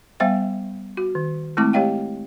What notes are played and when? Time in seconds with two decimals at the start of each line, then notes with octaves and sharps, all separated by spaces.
0.20 G3 B3 C5 E5 F5 G5
0.97 F#4
1.15 D#3
1.57 G#3 A3 C4 E4 A5 D6
1.73 G4 C#5 D#5 F5 G5